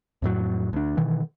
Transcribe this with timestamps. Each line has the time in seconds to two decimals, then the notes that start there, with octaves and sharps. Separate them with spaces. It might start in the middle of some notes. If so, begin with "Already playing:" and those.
0.22 F2 A2 F#3
0.73 D2 D4
0.97 B2 D#3 E3